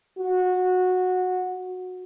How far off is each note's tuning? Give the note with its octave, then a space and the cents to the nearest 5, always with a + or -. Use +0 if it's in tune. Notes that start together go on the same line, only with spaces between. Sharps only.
F#4 -15